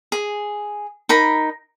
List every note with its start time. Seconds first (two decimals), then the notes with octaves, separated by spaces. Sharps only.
0.12 G#4
1.09 D#4 A#4 B5